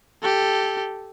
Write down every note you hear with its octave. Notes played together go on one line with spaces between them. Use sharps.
G4 A4